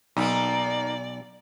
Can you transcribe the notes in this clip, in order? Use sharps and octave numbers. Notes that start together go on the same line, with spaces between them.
B1 A#3 D#4 D5